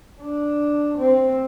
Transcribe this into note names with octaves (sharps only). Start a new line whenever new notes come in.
D4
C4